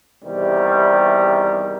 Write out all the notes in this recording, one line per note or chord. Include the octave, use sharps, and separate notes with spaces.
E2 C3 D#3 G3